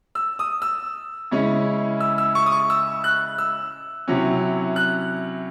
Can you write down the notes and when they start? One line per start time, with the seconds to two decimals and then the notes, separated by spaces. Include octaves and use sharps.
0.15 E6
0.39 D#6
0.62 E6
1.31 C#3 G#3 C#4 E4
2.00 E6
2.18 E6
2.35 C#6
2.46 D#6
2.52 C#6
2.70 E6
3.04 F#6
3.38 E6
4.08 C3 F#3 C#4 E4
4.76 F#6